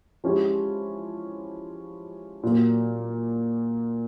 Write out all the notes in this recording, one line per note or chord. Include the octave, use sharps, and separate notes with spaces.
F3 G#3 C#4 E4 G4
A#2 F#3 A#3